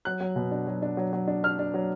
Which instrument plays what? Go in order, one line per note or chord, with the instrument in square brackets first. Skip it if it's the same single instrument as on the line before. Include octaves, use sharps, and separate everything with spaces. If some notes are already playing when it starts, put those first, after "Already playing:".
[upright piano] F#3 F#6
F#3
B2
D4
F#3
D4
F#3
F#3
D4
D4 F6
D4
F#3